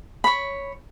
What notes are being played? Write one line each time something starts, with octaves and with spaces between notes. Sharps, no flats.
C#5 B5